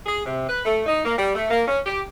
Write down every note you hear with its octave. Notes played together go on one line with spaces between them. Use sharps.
G#4
C3
B4
A3
D#4
A#3
G3
A3
A#3
C#4
G4